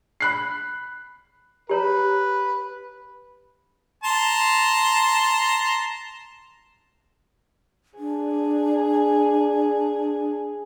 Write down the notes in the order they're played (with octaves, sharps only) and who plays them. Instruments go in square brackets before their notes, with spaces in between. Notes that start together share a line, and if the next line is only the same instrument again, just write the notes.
[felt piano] B5 F#6 C7
[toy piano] G4 C#5 A#5 [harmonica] B4
[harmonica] A5 A#5 C6
[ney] D4 [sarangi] G#4